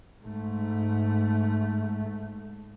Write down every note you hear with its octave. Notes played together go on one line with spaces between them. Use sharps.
G#2 A3